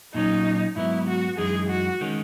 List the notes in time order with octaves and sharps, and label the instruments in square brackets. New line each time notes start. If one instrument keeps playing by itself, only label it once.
[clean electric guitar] A#2 F#3 C#4 [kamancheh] D#4
[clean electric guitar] G#2 F#3 B3 [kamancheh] E4
[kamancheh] F#4
[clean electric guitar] F#2 E3 G#3 D#4 [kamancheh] G#4
[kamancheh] F#4
[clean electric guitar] D#3 G#3 C#4